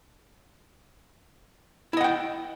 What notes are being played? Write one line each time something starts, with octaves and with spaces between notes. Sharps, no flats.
E4 D#5 F#5 G5